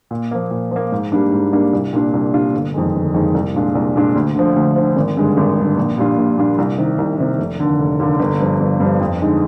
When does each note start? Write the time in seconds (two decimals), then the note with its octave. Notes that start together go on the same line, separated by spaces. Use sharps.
0.11 A#2
0.31 F3 A#3
0.51 A#2
0.71 F3 A#3
0.92 G#2
1.12 G3 A#3 D4
1.32 G#2
1.52 G3 A#3 D4
1.73 C2
1.93 A#2 G3 D4 F4
2.13 C2
2.33 A#2 G3 D4 F4
2.53 G1
2.74 F2 D#3 G#3
2.94 G1
3.14 F2 D#3 G#3
3.34 C2
3.54 A#2 G#3 D4 F4
3.75 C2
3.96 A#2 G#3 D4 F4
4.15 D2
4.35 D3 F3
4.56 D2
4.76 D3 F3
4.96 G#1
5.17 G2 D3 G#3
5.37 G#1
5.57 G2 D3 G#3
5.77 A#1
5.97 A#2 G3 D4 F4
6.18 A#1
6.37 A#2 G3 D4 F4
6.58 C2
6.78 C3 D#3
6.98 C2
7.19 C3 D#3
7.39 F1
7.60 D#2 D3
7.79 F1
7.99 D#2 D3
8.19 G1
8.40 G2 F3
8.60 G1
8.80 G2 F3
9.01 F2
9.21 D3 G#3 D#4